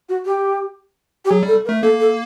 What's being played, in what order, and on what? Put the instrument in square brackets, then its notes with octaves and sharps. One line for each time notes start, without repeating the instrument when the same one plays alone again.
[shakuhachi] F#4
G4
G4
[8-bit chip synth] F#3 [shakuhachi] G#4
[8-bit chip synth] G3
[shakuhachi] A4
A#4
[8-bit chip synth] A3
[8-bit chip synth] A#3 [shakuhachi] A4
[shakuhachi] A4